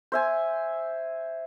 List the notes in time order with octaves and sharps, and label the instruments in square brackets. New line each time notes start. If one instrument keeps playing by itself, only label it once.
[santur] C5 E5 G#5